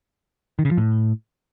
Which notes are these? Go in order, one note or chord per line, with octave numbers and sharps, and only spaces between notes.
D#3
C#3
F3
A2